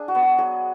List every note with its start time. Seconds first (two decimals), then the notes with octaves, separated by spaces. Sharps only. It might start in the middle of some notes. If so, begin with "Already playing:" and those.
Already playing: D4 G#4
0.08 F#4
0.15 B3
0.23 F#4
0.38 F#3 G#4